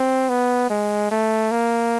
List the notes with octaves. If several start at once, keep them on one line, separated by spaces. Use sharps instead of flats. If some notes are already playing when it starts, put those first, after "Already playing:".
Already playing: C4
B3
G#3
A3
A#3